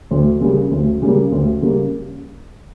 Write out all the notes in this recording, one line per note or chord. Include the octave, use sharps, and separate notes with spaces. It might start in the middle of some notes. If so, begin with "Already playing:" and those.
D2
C#3 G3 A#3
D2
C#3 G3 A#3
D2
C#3 G3 A#3